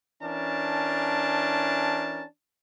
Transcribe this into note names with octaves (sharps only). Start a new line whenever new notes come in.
E3 C#4 D4 A#4 A5